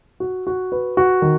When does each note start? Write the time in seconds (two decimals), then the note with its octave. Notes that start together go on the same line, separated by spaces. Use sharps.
0.20 F#4
0.47 F#4
0.72 B4
0.97 F#4
1.22 D#3